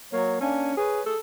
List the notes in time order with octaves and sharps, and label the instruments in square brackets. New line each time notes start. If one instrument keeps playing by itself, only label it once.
[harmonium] F#3 C#5 [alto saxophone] A#3
[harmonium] A#3 D4 G#5 [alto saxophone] C#4
[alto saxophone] G#4 [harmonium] B4 C#5
[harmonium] G#4 [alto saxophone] A4